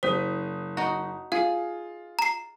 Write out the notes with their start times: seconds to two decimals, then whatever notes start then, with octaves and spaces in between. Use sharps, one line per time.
0.03 F#1 C5 D#6 B6
0.77 D#4 F#4
1.32 F4 G#4 F5
2.19 A#5 C7